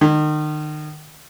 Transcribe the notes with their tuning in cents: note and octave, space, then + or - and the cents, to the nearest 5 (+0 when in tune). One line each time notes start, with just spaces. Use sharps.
D#3 -35